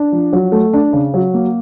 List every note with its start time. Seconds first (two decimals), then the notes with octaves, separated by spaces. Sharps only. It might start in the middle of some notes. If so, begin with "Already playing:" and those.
Already playing: D4
0.12 F3
0.33 F#3
0.52 A3
0.73 D4
0.93 C#3
1.14 F#3
1.34 A#3